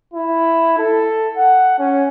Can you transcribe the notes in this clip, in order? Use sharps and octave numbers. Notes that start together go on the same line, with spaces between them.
E4
A4
F#5
C#4